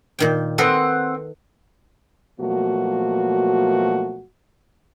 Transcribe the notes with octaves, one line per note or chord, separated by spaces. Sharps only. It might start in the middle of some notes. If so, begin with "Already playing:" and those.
A#2 D#3 G5
C4 A4 B4 D#5 F#5
B2 F3 F#3 A3 A#3 F#4